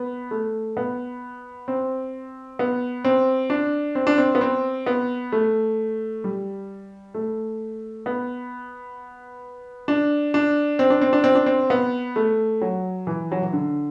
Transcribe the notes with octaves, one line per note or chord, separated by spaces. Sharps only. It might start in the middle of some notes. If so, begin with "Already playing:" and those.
Already playing: B3
A3
B3
C4
B3
C4
D4
C4
D4
C4
B3
C4
B3
A3
G3
A3
B3
D4
D4
C4
D4
C4
D4
C4
D4
C4
B3
A3
F#3
E3
F#3
E3
D3